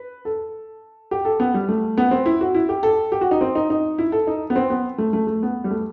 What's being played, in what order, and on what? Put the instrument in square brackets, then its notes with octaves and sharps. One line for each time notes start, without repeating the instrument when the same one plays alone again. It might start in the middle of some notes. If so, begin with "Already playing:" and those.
Already playing: [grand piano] B4
A4
G4
A4
B3
G3
A3
B3
C4
E4
F#4
E4
G4
A4
G4
F#4
D#4
C4
D#4
D#4
E4
A4
D#4
B3
C4
B3
A3
A3
A3
B3
G3
A3